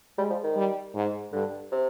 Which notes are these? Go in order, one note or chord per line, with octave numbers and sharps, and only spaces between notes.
G3 G#3
F3
D#3
G3
G#2
G2 D3
C3